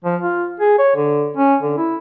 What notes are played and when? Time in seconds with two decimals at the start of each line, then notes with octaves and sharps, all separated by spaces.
0.05 F3
0.21 F4
0.60 G#4
0.79 C#5
0.96 D3
1.37 C#4
1.62 D3
1.77 E4